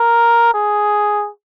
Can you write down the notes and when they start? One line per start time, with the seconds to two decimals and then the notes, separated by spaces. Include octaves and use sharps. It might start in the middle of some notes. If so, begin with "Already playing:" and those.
Already playing: A#4
0.54 G#4